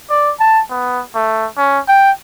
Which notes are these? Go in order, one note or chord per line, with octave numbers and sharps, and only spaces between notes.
D5
A5
B3
A3
C#4
G5